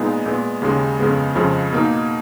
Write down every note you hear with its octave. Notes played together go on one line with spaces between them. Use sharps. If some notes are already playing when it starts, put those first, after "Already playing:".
Already playing: A#2 G#3 B3 D#4
A#2 G#3 B3
D#2 C#3 G#3
F2 C#3 G#3 B3
F2 C#3 F3 G#3
B2 A#3 D#4